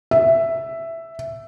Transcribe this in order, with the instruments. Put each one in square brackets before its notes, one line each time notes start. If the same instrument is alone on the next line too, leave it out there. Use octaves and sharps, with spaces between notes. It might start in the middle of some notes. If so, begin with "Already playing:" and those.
[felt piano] E5